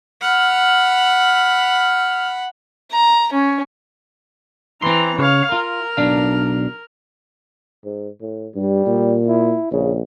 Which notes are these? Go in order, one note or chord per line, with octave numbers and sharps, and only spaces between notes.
F#5 B5 F6
A#5
C#4
E3 C4 A#5 C6
C#3 C#5 F5
F4 A#4
B1 D4 F5
G#2
A2
G2 G3
A#2
E4
A#1 C#3